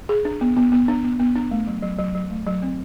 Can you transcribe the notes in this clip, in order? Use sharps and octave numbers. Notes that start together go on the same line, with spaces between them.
G#4
D4
B3
B3
B3
D4
B3
B3
D4
A3
F#3
F#3
F#3
F#3
A3
F#3
C4